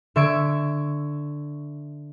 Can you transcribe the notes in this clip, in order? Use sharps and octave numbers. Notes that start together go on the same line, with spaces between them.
D3 E5 C#6 E6 G#6 D7